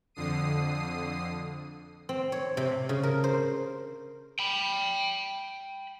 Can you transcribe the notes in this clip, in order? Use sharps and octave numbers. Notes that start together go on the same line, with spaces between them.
F2 D3 D#6 C7 D#7
C4
C#5
C3
C#3
A#4
C5
G5 B5